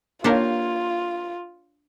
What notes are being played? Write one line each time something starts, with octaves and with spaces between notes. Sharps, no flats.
A#3 D4 F4 G4 A#4 C#5 F5